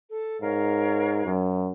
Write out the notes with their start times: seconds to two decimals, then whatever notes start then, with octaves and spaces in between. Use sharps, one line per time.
0.10 A4
0.41 G#2 A#4 C#5 F5
1.25 F#2